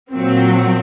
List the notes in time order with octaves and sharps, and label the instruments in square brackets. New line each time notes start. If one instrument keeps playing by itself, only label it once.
[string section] A#2 F#3 C4